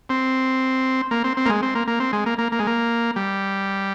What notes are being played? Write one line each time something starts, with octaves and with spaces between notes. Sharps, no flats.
C4
A#3
C4
C4
A#3
G#3
C4
A#3
A#3
C4
G#3
A#3
A#3
A#3
G#3
A#3
G3